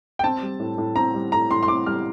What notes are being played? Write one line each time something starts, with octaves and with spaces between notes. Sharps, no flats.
G5
C4 A5
G3
A2
A2
C4 A#5
G3
A2 A#5
A2 C6
C6
C4 D6
G3 F6